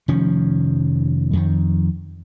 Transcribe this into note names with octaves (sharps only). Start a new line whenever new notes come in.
F1 D#3 F3 C#4
F2 D#3